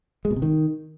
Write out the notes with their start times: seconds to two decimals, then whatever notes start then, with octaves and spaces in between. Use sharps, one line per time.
0.25 G#3
0.31 B2
0.36 C3
0.42 D#3